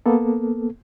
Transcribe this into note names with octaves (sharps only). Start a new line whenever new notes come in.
A#3 B3 A4